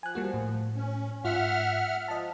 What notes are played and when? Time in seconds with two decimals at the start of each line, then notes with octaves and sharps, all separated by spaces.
0.03 F3 G#5 F#6
0.15 G3 A#3 F#4
0.34 A2
0.76 C#4
1.24 G#2 F4 E5 F#5 F6
2.08 F3 D#5 A5